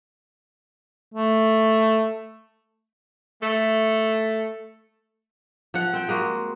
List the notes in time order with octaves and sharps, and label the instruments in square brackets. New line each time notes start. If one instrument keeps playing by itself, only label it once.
[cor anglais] A3
[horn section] A3
[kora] F3 F#5
C4 G5
G#3 A#3 F#4